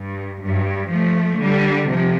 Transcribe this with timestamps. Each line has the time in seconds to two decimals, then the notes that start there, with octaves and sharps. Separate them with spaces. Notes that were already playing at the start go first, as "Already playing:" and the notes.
Already playing: G2
0.42 G2
0.91 F3 A3
1.41 D3 G3
1.89 C3 F3